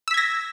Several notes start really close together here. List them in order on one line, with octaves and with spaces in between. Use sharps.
E6 B6 G#6 A#6